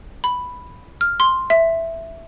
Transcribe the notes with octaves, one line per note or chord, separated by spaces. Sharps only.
B5
F6
C6
E5